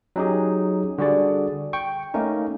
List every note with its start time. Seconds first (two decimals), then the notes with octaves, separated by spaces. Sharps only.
0.16 F#3 C#4 D#4 G4 G#4
0.98 D3 G3 F#4 G#4 D5
1.73 G5 C#6
2.14 A3 A#3 C#4 D#4